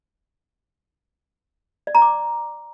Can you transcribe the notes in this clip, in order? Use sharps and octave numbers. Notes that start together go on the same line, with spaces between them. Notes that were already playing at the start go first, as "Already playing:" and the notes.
D5
A#5
D6